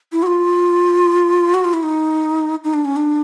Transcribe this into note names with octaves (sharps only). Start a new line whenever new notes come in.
E4
F#4
F4
F#4
F4
E4
D#4
D#4
D4
C#4
D4